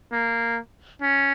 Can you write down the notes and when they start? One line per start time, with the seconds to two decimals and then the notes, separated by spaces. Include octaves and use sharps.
0.12 A#3
1.02 C#4